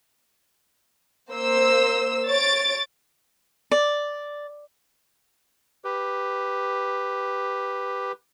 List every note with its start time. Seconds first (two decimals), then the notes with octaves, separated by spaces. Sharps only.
1.32 A#3 C5 E6
2.26 C#5 A6 D7
3.71 D5
5.84 G4 B4